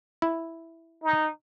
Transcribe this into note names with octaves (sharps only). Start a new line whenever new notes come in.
E4
D#4